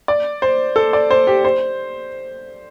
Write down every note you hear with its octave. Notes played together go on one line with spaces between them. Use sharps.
D5
C5
A4
D5
C5
G4
C5